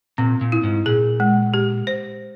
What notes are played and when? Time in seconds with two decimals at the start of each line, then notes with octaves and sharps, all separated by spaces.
0.18 A#2 C4
0.41 A#2
0.52 E4
0.63 G#2
0.86 A#2 G#4
1.20 G#3
1.54 G4
1.87 C5